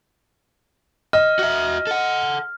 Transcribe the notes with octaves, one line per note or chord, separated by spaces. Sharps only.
D#5 F6
F#4 E5
A4 F#5